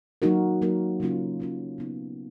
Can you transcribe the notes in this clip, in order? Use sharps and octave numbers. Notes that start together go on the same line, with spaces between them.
F#3 A#3 D#4 F#4 A#4
F#3 A#3 D#4 F#4 A#4
C#3 F#3 A#3 C#4 F4
C#3 F#3 A#3 C#4 F4
C#3 F#3 B3 D#4